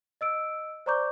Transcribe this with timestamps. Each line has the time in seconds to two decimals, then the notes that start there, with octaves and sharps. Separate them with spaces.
0.21 D#5 E6 D7
0.86 C5 D5 A#5 C#6 D6 G6